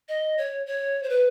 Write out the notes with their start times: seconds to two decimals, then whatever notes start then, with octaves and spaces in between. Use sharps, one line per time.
0.09 D#5
0.38 C#5
0.66 C#5
1.03 C5
1.09 B4